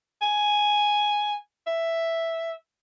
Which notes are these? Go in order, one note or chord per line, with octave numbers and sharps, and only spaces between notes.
G#5
E5